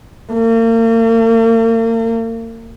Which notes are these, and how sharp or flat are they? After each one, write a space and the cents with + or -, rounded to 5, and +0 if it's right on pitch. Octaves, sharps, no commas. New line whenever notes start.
A#3 -40